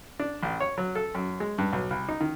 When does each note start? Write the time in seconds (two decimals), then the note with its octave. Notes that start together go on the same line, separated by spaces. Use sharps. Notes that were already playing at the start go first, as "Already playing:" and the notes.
0.19 D4
0.43 A1
0.60 C#5
0.78 F#3
0.95 A4
1.15 F#2
1.40 G#3
1.58 G2
1.73 B1
1.90 C2
2.09 D#4
2.20 D#3